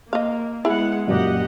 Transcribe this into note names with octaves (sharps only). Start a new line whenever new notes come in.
A#3 D#5 F5
G#3 B3 E4 G#4 F#5
F#2 A#2 C#3 G4 D#5 F#5